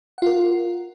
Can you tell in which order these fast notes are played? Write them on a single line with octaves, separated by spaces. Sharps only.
F#5 F4 A#4